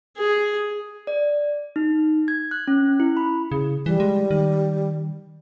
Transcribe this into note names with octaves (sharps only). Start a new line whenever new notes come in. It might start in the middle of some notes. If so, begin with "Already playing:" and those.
G#4
D5
D#4
G#6
F#6
C#4
E4
B5
C#3 G#4
E3 G3
G#3
D#3